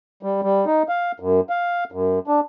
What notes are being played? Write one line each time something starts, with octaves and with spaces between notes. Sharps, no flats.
G3
G3
D#4
F5
F#2
F5
F#2
D4